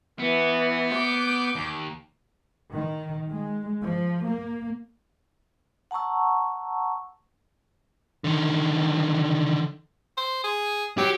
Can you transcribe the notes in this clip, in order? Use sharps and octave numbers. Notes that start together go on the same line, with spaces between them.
E3 B3
D6 G6
D#2
D#3
G#3
F3
A#3
F#5 A5 A#5 C#6 E6
D3 D#3
C5
G#4
F#3 G4